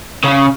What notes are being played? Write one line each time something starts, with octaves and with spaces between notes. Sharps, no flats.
C#3